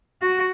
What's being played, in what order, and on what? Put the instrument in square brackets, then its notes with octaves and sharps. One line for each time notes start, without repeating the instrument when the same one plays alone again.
[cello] F#4